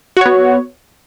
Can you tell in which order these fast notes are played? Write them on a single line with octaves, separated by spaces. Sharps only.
F#4 C#5 B3